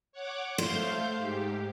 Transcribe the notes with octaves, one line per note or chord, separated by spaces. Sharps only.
C#5 F#5 D6
A3 C5 F5 G6
G#2 G4